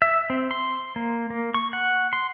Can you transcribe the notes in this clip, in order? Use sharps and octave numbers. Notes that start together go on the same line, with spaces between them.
E5
C4
C6
A#3
A#3
C#6
F#5
C6